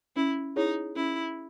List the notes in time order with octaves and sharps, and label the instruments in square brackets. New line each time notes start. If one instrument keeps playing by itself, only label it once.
[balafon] C#4 [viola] E4
[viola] D#4 [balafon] E4 G#4 C#5
[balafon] C#4 [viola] E4